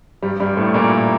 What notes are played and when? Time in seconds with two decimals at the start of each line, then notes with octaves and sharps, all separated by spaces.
0.23 G2 G3
0.40 G2 G3
0.57 A2 A3
0.74 A#2 A#3